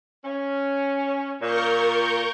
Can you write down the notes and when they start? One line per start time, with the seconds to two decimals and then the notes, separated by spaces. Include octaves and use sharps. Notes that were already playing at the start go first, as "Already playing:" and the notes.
0.25 C#4
1.41 A#2 A#4 C#6 G6